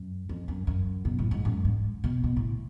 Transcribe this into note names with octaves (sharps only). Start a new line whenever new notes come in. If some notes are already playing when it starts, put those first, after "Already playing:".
Already playing: F#2
F2
F#2
F#2
B2
A2
G#2
F#2
G#2
B2
B2
A2